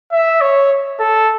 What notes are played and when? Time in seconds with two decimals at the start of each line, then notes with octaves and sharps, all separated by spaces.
0.12 E5
0.41 C#5
1.00 A4